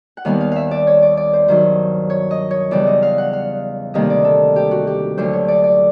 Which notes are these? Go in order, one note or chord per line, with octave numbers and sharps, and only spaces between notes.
F#5
D#2 D#3 G3 B3 F5
F5
E5 F5
D5
C#5
D5
D5
C5
G2 D#3 F#3 C5
C#5
D#5
C#5
E2 C#3 E3 G3 D5
D#5
F5
F#5
F5
D2 C3 D#3 G3 A#3 D#5
D5
A4
G4
F#4
G4
D2 D3 F#3 C5
C#5
D5
D5